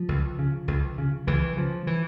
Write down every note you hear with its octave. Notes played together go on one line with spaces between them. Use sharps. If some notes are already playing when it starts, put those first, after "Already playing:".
Already playing: F3
C#2
C#3
C#2
C#3
C#2 E3
C#3 F3
E3